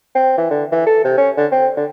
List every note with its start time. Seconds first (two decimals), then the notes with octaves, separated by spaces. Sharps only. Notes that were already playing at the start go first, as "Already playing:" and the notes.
0.15 C4
0.38 E3
0.50 D3
0.72 E3
0.86 A4
1.04 C3
1.18 C#4
1.37 D3
1.52 C4
1.77 D3